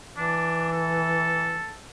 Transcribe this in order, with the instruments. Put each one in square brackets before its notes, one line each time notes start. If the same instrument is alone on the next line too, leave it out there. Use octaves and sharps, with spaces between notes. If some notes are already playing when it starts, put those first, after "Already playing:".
[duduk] E3 [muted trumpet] D4
[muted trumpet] A4